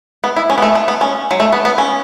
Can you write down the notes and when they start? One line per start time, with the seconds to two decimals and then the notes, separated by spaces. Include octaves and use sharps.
0.24 B3
0.36 E4
0.50 C#4
0.58 B3
0.62 A3
0.75 A3
0.88 B3
1.01 C#4
1.31 F#3
1.40 A3
1.53 B3
1.65 B3
1.78 C#4